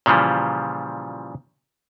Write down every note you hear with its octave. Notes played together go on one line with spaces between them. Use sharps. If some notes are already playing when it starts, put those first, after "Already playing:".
A#2 C#3 E3 F3 G3